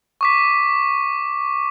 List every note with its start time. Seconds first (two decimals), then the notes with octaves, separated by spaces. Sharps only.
0.21 C#6 D6 B6